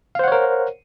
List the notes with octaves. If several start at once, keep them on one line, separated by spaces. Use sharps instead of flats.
A#4 C5 C#5 F5 F#5